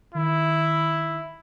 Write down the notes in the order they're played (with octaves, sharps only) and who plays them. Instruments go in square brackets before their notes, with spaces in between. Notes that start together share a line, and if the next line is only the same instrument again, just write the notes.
[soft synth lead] D#3 [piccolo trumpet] E4